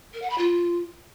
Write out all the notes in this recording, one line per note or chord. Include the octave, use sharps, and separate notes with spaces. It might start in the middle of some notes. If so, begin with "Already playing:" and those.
A#4
F#5
B5
F4